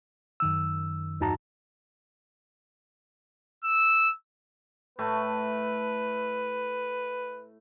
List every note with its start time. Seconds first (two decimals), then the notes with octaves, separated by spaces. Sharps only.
0.40 F#2 D#3 E6
1.20 E2 G2 D#4 F#4 A5 A#5
3.64 E6
4.99 A2 A3 B4